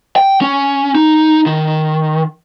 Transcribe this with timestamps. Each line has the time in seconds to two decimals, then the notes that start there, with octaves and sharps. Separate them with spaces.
0.16 G5
0.41 C#4
0.95 D#4
1.46 D#3